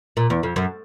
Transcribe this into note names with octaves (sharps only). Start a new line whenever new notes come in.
A#2
E2
F2
F#2